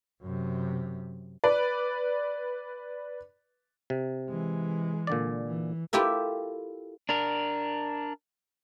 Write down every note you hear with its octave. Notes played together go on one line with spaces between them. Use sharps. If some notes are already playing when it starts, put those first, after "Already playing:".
F#2 C3
B4 D5
C3
E3 G#3
A#2 D3 D5
E3
E4 F4 G4 A4 A#4
D4 A#4